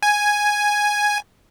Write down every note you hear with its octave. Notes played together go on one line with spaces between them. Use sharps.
G#5